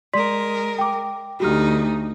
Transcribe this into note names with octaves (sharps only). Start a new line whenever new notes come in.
G#3 A#4 D5 C6 B6
G5 D6
D2 D#4 F#4 G4 F6